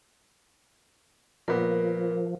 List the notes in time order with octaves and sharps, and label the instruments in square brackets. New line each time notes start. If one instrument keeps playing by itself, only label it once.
[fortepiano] A#2 B3 [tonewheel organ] F3 [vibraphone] A#4